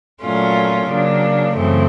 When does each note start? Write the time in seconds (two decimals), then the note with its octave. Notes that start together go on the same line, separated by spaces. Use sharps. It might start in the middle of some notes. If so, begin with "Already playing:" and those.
0.21 A#2 F#3 A3 C#4 F4
0.87 C#3 F#3 A#3 D4
1.54 F#2 C#3 E3 A3 C4